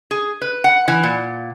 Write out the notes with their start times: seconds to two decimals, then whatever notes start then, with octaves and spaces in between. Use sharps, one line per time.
0.11 G#4
0.41 B4
0.64 F#5
0.88 E3
1.03 A#2